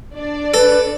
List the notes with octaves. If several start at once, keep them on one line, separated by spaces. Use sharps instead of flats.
D4 D5
A4 B4